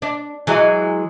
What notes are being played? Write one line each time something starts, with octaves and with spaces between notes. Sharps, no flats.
D4
E3 F#3 G#3